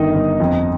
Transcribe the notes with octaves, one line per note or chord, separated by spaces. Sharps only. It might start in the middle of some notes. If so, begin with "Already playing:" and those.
Already playing: G1 D#3 D#4 D#5
G1
F2